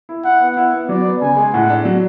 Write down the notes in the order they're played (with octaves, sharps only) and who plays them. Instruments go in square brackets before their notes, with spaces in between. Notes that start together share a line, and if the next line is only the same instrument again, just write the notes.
[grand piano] E4
[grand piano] E4 [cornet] F#5
[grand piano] B3
[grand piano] E4 [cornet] F#5
[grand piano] B3
[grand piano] F#3 [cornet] D5
[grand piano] B3
[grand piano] C#3 [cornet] G#5
[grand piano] G#3
[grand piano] A2 [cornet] F#5
[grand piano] D4
F#3